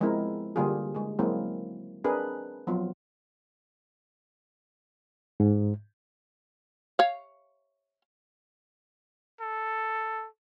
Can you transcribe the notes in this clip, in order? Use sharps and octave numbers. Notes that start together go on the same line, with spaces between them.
F3 G#3 B3 C4 E4 A#4
D3 G3 A#3 F4 G4 G#4
G#3 G#4
F#3 G#3 A#3 C4 E4 G#4
C4 D4 G#4 A#4 B4
F3 F#3 B3 F4
G#2
C#5 F5
A4